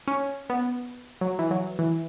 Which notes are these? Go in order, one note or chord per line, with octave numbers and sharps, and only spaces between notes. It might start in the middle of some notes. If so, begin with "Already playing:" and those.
C#4
B3
F#3
E3
F#3
E3